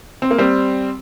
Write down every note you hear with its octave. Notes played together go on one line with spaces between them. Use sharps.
C4
A#3
G3 C4